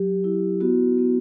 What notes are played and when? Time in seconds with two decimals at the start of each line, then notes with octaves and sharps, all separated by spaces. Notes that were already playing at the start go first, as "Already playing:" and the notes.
Already playing: F#3 G4
0.24 E4
0.61 B3 F#4
0.98 B3